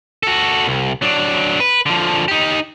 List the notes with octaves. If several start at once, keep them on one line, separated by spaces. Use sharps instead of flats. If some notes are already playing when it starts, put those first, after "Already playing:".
F#4 A4
C2
F#3 D4
B4
D3 F3
D#4 G4